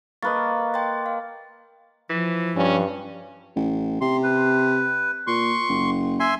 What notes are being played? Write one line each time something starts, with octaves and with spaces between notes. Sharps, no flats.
A#3 B4 D#5 F5 C#6 A6
G5 C6 A6
F5
E3 F3
G2 C#4
A1
C3 C6
B4
A#2 C6 C#6
F#1
E5 G#5 C6